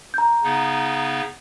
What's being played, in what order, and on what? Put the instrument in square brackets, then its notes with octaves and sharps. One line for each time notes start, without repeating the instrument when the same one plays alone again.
[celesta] A#5 G6
[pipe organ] C#3 B3 D#4